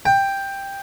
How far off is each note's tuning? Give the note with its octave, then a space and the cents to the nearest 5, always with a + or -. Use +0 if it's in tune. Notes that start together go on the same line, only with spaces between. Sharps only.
G5 +10